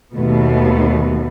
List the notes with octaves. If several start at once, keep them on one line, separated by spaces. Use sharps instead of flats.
D#2 B2 A3 B3